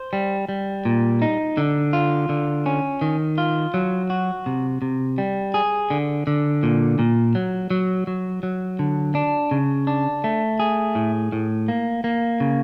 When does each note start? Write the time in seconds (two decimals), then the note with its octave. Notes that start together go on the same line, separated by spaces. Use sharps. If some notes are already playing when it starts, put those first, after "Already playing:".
Already playing: C5
0.13 G3
0.49 G3
0.85 A#2
1.22 D#4
1.57 D3
1.93 F4
2.29 D3
2.66 C#4
3.01 D#3
3.38 F4
3.74 F#3
4.10 F#4
4.46 C3
4.82 C3
5.18 G3
5.54 G#4
5.90 D3
6.27 D3
6.63 A#2
6.99 A#2
7.35 F#3
7.70 F#3
8.07 F#3
8.43 F#3
8.79 D3
9.15 D4
9.51 C#3
9.87 D4
10.24 A3
10.60 G#4
10.95 A2
11.32 A2
11.68 A#3
12.04 A#3
12.40 C#3